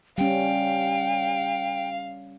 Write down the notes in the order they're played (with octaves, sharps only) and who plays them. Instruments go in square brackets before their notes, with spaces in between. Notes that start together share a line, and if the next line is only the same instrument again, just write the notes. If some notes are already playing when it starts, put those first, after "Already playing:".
[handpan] G3 C#4 [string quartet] F5 [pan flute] G5